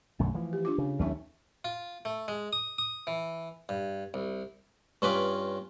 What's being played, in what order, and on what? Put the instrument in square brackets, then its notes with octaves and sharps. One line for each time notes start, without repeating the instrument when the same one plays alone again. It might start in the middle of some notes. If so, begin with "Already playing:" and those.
[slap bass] B1 F#2 D3 [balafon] A3
[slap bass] E3 F3
[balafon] G4
D4 F4 D6
[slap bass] C#3
[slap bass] D#2 A3 C#4 [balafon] F#3 D#4 E5
[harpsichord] F4
A3
G#3
D#6
D#6
E3
G2
C2
G2 C#4 F4 B4 B5 D6